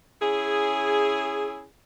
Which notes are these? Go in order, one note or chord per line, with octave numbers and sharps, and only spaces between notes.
C#4 E4 G#4